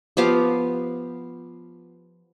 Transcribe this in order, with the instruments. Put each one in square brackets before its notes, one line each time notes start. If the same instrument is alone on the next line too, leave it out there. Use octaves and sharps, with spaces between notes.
[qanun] F3 B3 G4 F5